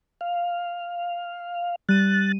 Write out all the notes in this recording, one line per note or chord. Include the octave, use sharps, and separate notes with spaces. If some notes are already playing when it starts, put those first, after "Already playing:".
F5
G3 F#6 A6 D#7